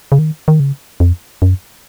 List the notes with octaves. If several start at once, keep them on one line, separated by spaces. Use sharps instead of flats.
C#3
D#3
D#3
C#3
F2
F#2